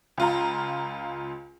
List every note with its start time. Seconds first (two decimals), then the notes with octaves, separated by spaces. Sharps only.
0.18 C#2 F4 A#5